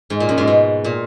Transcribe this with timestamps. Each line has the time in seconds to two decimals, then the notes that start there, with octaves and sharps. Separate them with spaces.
0.10 G#2
0.20 A#2
0.29 F#2
0.38 G#2
0.47 B2
0.84 A#2